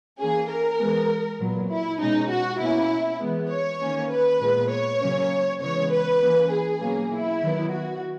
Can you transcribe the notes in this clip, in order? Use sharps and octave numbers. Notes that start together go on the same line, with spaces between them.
E3 A#3 C#4 G#4
A#4
E3 G#3 B3
A#2 F#3 B3
E4
B2 G#3 C#4 D#4
F#4
B2 A#3 C#4 E4
E3 G#3 B3
C#5
D#3 A#3 C#4
B4
A#2 G#3 B3
C#5
C#3 F#3 A#3 C#4
C#3 E3 G#3 B3 C#5
B4
E3 A#3 C#4
G#4
B2 F#3 A#3 C#4
E4
D#3 F#3 B3
F#4